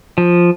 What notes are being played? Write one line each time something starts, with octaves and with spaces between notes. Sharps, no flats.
F3